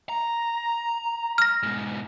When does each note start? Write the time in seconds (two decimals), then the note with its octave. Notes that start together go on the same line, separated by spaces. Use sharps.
0.09 A#5
1.38 F6 A#6
1.63 G#2 B2